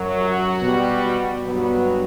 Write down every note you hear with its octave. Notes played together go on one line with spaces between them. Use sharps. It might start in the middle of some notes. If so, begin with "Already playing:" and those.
Already playing: F#2 F#3
F#4
B2 G3
G2 F#3 B3